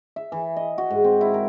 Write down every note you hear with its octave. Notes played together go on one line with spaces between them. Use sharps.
E5
E3
D#5
F#4
G#2
C4
E4
A#4